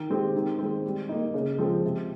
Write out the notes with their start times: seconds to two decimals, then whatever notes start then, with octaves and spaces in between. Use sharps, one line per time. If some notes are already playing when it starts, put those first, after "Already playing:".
Already playing: D#3
0.10 G#3 C4 G4
0.35 D#3
0.59 G#3 C4
0.85 G3
1.09 A#3 D#4
1.34 C#3
1.58 F3 G#3 C4
1.84 C3